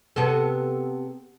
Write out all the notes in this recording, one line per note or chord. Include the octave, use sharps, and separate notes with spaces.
C3 B3 A4